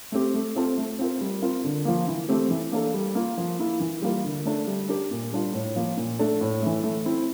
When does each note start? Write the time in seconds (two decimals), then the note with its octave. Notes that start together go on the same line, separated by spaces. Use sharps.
0.12 A3 C4 G4
0.34 A3
0.56 C4 F4 A4
0.78 A3
0.99 C4 F4 A#4
1.21 G3
1.42 C4 F4 A#4
1.64 D3
1.85 F3 A#3
2.08 E3
2.29 A3 C4 G4
2.50 E3
2.72 A#3 D4 A4
2.94 G3
3.15 A#3 F4
3.37 F3
3.59 A#3 E4
3.80 E3
4.02 G3 A#3 F4 A#4
4.24 D3
4.45 A3 D4 A4
4.67 G3
4.88 D4 G4 A#4
5.11 A#2
5.32 G3 D4 F4
5.54 A2
5.76 F3 A#3
5.97 A#2
6.19 A3 D4 A4
6.41 A2
6.62 E3 A3
6.83 A3
7.05 C4 E4